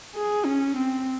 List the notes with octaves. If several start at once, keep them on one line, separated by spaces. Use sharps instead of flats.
G#4
C#4
C4